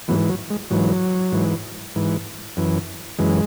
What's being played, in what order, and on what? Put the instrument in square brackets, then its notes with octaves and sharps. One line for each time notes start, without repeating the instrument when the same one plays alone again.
[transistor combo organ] G#2 E3 F#3 B3
F#3
G#3
G#2 E3 F#3
G#2 E3
G#2 E3
F#2 E3
F#2 E3 G#3